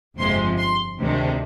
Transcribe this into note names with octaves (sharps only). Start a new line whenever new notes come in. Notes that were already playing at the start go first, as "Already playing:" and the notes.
G1 F2 C3 F3 G#3 C6
C6
D2 C3 D#3 G#3 D4